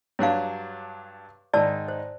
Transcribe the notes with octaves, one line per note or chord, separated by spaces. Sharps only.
G2 F#3 D4 C#5 F5
G#2 D#3 D#4 D5 A5 E6
C5